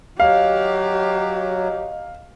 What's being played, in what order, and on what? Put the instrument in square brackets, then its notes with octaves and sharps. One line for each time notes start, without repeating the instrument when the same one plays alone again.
[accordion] F#3 [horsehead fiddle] G4 [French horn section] D#5 [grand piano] F5